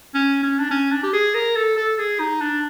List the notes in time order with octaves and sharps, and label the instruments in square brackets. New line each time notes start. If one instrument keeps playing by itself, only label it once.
[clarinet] C#4
C#4
D4
C#4
D4
G4
G#4
A#4
A4
A4
G#4
D#4
D4